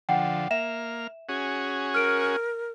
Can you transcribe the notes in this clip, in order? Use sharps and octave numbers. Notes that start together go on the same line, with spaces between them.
D3 F3 F#5 G5
A#3 E5 F6 E7
C#4 F#4 G#4
A#4 F6 D7